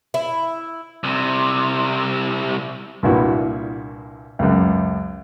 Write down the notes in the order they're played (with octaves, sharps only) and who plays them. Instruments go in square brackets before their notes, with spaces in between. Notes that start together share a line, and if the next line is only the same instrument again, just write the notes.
[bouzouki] E4
[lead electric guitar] C2 C3
[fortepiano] C2 G2 A#2 E4 F#4
C#2 F#2